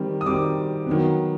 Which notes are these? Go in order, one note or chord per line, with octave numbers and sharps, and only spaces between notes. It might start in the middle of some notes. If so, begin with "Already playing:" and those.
Already playing: D#3 G3 C4
D#6
D#3 G3 C4 D6
D#3 F#3 B3